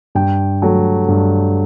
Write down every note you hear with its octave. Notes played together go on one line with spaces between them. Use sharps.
G2 G5
F#3 A3
G2